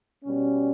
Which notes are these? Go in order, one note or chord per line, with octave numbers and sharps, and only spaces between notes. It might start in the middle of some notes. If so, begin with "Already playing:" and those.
B2 G3 C#4